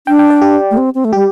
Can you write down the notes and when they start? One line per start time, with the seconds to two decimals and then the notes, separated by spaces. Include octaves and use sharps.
0.07 D4 G5
0.19 G5
0.30 D5
0.42 G4
0.71 A3
0.77 C4
0.95 C4
1.05 A3
1.13 G3 G4